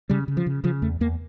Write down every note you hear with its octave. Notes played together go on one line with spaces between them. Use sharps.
C#3 G3
C#3
F3
C#3
C#3 F3
E2 A3
E2 A#3